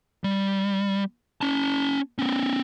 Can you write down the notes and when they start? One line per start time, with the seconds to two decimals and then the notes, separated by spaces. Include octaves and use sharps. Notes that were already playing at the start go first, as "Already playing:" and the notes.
0.24 G3
1.41 C#4 A5
2.19 B3 C#4